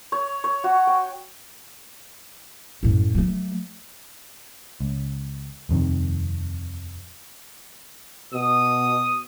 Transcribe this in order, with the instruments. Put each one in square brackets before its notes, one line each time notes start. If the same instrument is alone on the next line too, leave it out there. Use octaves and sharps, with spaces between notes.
[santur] C#5
C#5
F#4
G5
[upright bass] F#2 A2
F#3 A3
[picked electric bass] C#2
D#1 F2 C3 D#3
[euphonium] B2 [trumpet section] D#6